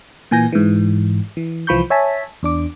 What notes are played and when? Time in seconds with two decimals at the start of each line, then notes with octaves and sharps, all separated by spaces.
0.31 A#2 E3 G#5 G6 A#6
0.52 G#2 E3
1.37 E3
1.67 C2 E3 F3 B5 C#6 G6
1.90 C#5 E5 G#5 A5 B6
2.43 E2 D4 D6